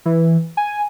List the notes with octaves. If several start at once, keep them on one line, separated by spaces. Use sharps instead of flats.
E3
G#5